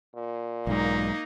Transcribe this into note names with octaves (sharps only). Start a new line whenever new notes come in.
A#2
B1 G#2 A#3 D#4